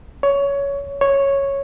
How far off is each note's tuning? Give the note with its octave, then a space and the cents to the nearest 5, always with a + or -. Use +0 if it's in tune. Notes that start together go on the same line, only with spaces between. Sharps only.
C#5 +15
C#5 -5